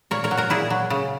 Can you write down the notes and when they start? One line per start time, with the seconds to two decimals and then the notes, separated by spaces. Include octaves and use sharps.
0.11 A#2 A#4 C#5
0.24 A#4 C#5
0.31 F#3
0.37 F#4 A#4
0.50 A#2 E4 G#4
0.70 F#3
0.90 C#3